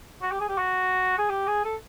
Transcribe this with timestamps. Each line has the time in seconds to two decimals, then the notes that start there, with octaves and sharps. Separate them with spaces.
0.22 F#4
0.32 G4
0.41 G#4
0.49 G4
0.58 F#4
1.18 G#4
1.30 G4
1.47 G#4
1.65 A4